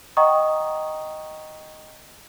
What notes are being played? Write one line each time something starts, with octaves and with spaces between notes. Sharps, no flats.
D#5 F#5 G5 A#5 C#6 D#6